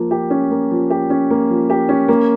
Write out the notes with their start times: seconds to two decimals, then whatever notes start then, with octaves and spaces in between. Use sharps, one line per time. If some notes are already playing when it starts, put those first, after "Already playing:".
Already playing: F3 A#3
0.11 G4
0.30 C#4
0.51 A#3
0.71 F3
0.90 G4
1.10 C#4
1.30 A#3
1.50 F3
1.70 G4
1.89 C#4
2.08 A#3